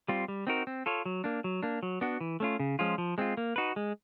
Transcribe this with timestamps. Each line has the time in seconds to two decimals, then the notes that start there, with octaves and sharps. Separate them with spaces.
0.08 G3 C4 F4
0.28 G3
0.47 C4 D#4 F#4 A#4
0.67 C4
0.86 F4 A4 C#5
1.06 F#3
1.24 A#3 D4
1.44 F#3
1.63 A#3 D4
1.83 F#3
2.01 B3 D4 F#4
2.21 E3
2.40 A3 C#4 F4
2.59 C#3
2.79 F3 G#3 C#4 F4
2.98 F3
3.18 G#3 C4 F4
3.37 A#3
3.56 D#4 F#4 B4
3.76 G#3